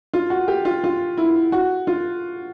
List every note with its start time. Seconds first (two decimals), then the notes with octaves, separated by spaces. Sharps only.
0.14 F4
0.30 F#4
0.48 G4
0.65 F4
0.84 F4
1.17 E4
1.52 F#4
1.87 F4